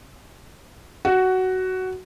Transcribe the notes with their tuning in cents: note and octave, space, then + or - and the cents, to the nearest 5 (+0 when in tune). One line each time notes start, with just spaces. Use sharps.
F#4 +10